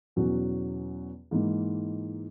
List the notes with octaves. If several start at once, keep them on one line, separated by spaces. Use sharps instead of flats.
E2 B2 F#3 C#4 F#4
G#2 E3 A#3 D#4